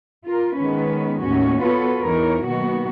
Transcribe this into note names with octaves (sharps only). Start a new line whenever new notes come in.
F4 A#4
D#3 G#3 B3 C#4 B4
D#2 A2 C#4 F#4
B3 F4 F#4 A4 B4 C#5
E2 E3 D#4 A#4 C#5
B2 D#3 F#3 A#3 B3 F#4